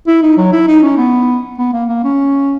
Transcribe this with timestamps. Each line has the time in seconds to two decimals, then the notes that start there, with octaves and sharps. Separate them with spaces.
0.07 E4
0.22 D#4
0.37 F#3
0.52 E4
0.67 D#4
0.82 C#4
0.97 B3
1.58 B3
1.73 A#3
1.88 A#3
2.04 C#4